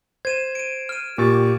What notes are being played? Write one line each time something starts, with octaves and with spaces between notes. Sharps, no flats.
C5 G#6 D#7 E7
D7 D#7
F6 D#7
A#2 G4 C#6 A6